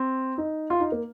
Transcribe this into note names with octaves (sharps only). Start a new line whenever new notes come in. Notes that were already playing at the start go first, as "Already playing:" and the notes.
Already playing: C4
D#4
F4
D#4
A#3